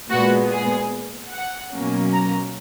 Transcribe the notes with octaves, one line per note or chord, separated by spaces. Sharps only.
A#2 G#3 B3 F#4
G#4
F#5
B2 F#3 A#3 C#4
A#5